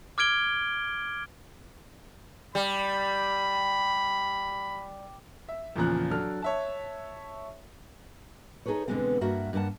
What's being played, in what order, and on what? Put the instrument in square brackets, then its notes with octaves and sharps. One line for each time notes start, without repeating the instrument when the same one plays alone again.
[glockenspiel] D6 F6 G#6 D7 G7
[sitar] G3 [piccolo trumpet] B5
[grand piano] E5
E2 A#2 C#3 F3 A#5 F#6
F#3 D4 A4 F6
C#5 E5 A5
[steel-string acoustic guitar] D#4 G#4 A4 B4 C#5
B2 D3 E3 G#3 B3 C4
G2 A#3 F#4 E5 F#5
G2 A#3 E4 F#5 A5